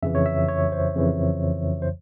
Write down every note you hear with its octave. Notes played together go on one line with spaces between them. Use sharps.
F2 C#3 E3 E5
C#5
E5
C#5
C5
F2 C#3 E3
C5